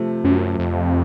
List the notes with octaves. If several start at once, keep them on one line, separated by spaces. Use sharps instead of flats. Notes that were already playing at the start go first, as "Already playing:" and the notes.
Already playing: C3 F3 A3
F#2
F2